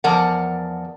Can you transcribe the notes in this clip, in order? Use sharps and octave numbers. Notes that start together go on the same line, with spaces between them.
E2 F3 A#4 D5 F#5